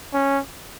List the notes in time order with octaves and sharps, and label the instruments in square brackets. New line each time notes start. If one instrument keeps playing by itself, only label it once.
[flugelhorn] C#4